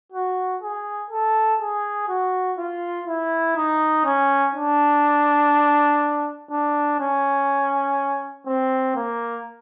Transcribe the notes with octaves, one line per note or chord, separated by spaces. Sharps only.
F#4
G#4
A4
G#4
F#4
F4
E4
D#4
C#4
D4
D4
C#4
C4
A#3